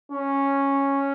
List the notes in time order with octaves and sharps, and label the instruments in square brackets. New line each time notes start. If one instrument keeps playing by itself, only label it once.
[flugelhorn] C#4